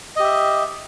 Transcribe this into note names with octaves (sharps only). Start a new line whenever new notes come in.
G4 D#5 E5